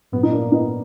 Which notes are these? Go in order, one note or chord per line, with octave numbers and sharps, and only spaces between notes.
A#2 F#3 B3
D#4
A#3 D4
B3 D#4